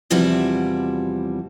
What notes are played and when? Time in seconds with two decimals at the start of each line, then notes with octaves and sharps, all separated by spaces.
0.10 E2 C3 F3 G3 E4 F#4